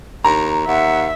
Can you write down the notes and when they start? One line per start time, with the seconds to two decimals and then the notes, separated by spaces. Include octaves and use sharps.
0.24 D#2 A#5
0.67 D#2 E5 F#5